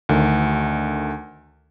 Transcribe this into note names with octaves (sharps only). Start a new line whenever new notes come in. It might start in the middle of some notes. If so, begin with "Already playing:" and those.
D2 D3 D#3